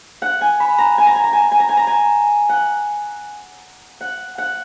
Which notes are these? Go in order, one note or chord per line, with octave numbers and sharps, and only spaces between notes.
F#5
G#5
B5
A#5
G#5
A#5
G#5
A#5
G#5
A#5
G#5
A#5
G#5
A#5
G#5
F#5
F#5
F#5